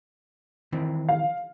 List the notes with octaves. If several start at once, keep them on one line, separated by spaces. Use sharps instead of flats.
D#3 E3 C4
F5